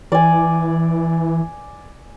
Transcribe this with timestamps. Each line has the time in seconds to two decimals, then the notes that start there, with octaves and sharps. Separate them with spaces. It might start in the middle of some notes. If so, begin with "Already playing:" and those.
0.12 E3 D5 G#5